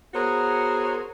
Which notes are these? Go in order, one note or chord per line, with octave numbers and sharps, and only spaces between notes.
B3 F#4 G#4 A#4 C5 C#5